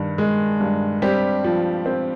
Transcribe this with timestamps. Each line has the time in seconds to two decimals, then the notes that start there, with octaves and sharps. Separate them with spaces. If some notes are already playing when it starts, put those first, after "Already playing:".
Already playing: G2 D#3
0.18 G#3
0.60 G2
1.02 G3 C4 G4
1.44 F3
1.86 C4